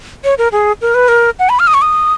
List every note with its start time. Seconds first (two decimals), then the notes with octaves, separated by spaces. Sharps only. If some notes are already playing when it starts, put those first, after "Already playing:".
0.24 C#5
0.38 A#4
0.52 G#4
0.81 A#4
0.95 B4
1.08 A#4
1.39 F#5
1.49 B5
1.59 F6
1.67 D#6
1.74 C#6
1.82 D#6